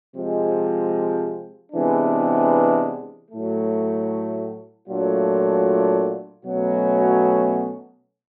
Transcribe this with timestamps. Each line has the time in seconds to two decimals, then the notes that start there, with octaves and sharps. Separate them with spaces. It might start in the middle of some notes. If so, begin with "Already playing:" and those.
0.15 C3 F3 G#3
1.72 C3 E3 G#3 B3 D4
3.30 A2 F#3 A3
4.88 A#2 F#3 A3 D4 F4
6.45 B2 F#3 A3 C#4 F#4